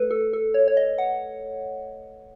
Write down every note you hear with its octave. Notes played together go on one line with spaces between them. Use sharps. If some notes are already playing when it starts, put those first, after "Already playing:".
Already playing: A3 A4 B4
A4
A4
C#5
C#5
D#5
F#5